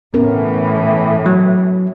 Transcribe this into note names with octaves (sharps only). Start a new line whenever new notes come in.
A2 E3 B3 C#4 A#4
F#3